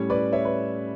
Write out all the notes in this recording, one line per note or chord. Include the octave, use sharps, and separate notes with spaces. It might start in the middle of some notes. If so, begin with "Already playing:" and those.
Already playing: A2 G3 C#4 C#5
B4 D5
C#5 E5
B4